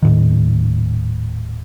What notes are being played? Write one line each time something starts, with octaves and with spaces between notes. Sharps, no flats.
D#1 A2 D#3